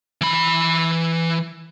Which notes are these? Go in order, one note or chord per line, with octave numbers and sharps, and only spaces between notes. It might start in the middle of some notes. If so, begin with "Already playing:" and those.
E3 B5